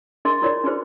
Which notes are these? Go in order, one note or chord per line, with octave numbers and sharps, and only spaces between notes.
D4 G#4 A#4 D#5 C6
E4 F4 A#4 C#5 D5
D4 F4 F#4 G#4 B4 C5